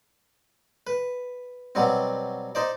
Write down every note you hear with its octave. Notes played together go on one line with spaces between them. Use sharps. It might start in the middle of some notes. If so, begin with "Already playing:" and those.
B4
B2 F#3 G3 C4
D#4 C5 D5